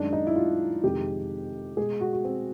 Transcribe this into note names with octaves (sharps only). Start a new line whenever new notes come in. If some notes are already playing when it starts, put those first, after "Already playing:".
Already playing: F#2 D#3 G#3 D4
D#4
E4
F4
F2 C3 D#3 G#3 G4
B2 G#3 G#4
F#4
F#4
C4